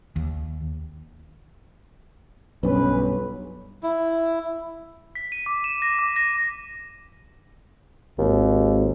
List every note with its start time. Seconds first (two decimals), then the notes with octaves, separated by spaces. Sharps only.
0.16 D#2
2.63 B1 G2 C#4 B4
3.83 E4
5.15 B6
5.32 D#7
5.46 D6
5.64 E7
5.82 A#6
5.99 D6
6.16 A#6
8.19 G#1 D#2